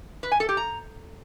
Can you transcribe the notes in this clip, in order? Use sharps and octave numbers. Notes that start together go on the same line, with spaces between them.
B4
G#5
A4
G4
A#5